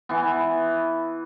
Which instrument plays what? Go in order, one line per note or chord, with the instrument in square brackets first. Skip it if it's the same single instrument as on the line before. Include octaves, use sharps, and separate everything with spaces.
[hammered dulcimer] E3 B3